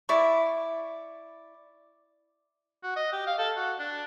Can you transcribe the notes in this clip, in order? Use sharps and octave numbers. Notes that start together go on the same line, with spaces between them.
E4 D5 C#6
F#4
D#5
G4
F5
A4
F#4
D4